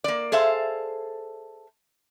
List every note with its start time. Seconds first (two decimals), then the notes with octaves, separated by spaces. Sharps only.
0.04 A#3 D5
0.32 G#4 A4 C5 E5 F5